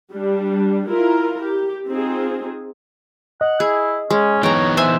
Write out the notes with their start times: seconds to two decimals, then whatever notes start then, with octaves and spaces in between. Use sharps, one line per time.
0.11 G3 D4
0.87 E4 F4 A#4
1.42 G4
1.88 C4 D#4 F4 G#4
3.41 D#5 F#5
3.60 E4 G#4
4.10 G#3 C#4
4.43 E3 B3 D#4 C#5 G5 A#5
4.77 C5 E5 G#5